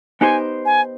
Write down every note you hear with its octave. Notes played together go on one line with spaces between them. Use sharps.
B3 D#4 G4 C5 G#5
G#5